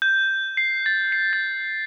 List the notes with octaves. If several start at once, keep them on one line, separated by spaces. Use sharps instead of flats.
G6
C7
A6
C7
A6